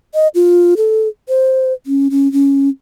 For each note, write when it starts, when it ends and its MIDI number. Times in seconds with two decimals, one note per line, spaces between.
0.14 0.28 75
0.35 0.74 65
0.77 1.08 69
1.28 1.73 72
1.86 2.08 61
2.10 2.31 61
2.32 2.69 61